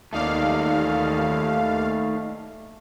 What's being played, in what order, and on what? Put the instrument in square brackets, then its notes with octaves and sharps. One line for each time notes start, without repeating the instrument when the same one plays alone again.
[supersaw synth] D#2 F5 [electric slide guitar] A3 D#4 D5